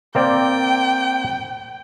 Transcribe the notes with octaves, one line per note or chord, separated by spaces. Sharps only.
A#3 C4 D5 G5